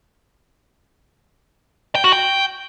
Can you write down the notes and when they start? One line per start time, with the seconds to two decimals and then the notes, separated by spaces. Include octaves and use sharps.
1.95 G5
2.04 F#4
2.13 G5